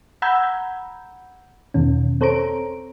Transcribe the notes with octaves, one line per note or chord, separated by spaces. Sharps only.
F#5 A#5 B5 E6 G6 G#6
E2 B2 D#3 C#4
C4 A4 C5 C#5 A#5 D7